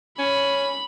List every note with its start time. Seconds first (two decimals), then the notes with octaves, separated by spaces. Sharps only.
0.19 C#4 B5